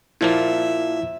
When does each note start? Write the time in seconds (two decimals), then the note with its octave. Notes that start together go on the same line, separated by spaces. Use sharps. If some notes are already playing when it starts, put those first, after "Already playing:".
0.21 A#2 F3 A#3 E4 E5